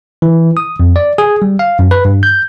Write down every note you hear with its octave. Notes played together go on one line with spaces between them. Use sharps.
E3
D#6
F2
D5
G#4
G3
F5
F#2
B4
G2
G6